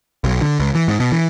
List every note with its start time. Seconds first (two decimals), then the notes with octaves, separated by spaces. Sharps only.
0.24 B1
0.41 D3
0.60 C#2
0.75 E3
0.88 G#2
1.00 B2
1.12 E3